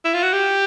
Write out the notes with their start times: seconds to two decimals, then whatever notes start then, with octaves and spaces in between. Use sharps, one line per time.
0.05 E4
0.14 F4
0.23 F#4
0.33 G4